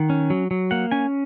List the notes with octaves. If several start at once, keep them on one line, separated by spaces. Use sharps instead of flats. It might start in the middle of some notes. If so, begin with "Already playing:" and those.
Already playing: D#3 F#5
C#4
F#3
F#3
A#3 F#5
C#4 G#5